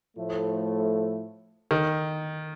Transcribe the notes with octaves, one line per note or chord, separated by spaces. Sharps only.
A2 F3 A3
D#3